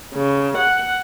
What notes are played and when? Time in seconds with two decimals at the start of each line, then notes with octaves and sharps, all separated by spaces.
0.13 C#3
0.57 F#5